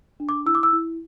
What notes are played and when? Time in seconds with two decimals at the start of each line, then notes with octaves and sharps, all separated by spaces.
0.20 D4
0.29 D6
0.46 E4 E6
0.55 D6
0.63 E6
0.73 E4